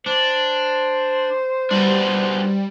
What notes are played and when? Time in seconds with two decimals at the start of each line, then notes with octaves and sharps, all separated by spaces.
0.06 D4 C5
1.71 G3 D4 F#4 B4